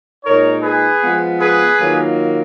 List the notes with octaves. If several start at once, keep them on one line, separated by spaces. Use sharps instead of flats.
A#2 G#3 D#4 A#4 C#5
G#4 B4
F3 G#3 B3 F4
G#4 B4
D#3 F#3 A#3 F4